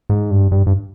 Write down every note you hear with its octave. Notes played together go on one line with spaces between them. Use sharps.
G#2
G2
G2
G2